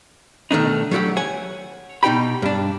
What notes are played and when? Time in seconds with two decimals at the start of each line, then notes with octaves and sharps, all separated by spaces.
0.51 B2 D#3 A3 D4 D#4
0.91 F#3 G3 A3 F#4 G4 F#5
1.16 C#5 F#5 G#5
2.03 B2 D#4 G4 G5 B5
2.42 G2 D4